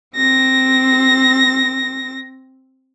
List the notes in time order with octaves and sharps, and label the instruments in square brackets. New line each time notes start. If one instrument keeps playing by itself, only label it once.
[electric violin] C4 A#6